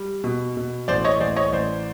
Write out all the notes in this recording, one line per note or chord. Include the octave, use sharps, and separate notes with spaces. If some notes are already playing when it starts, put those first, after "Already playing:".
Already playing: G3
B2
B2
A1 C5 D5
C#5 D#5
A1 C5 D5
C#5 D#5
A1 C5 D5